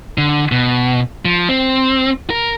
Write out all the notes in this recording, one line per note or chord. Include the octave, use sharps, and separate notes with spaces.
D3
B2
F3
C4
A#4